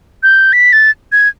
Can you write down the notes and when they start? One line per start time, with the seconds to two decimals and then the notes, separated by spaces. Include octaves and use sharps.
0.23 G6
0.53 B6
0.73 A6
1.12 G#6